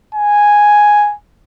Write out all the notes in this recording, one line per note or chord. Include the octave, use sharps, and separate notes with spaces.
G#5